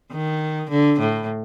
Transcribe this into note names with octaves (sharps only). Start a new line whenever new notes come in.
D#3
D3
A2